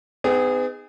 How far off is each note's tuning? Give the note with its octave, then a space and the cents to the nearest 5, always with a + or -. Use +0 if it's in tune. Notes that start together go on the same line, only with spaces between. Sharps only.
B3 +45 D#4 +0 G#4 -20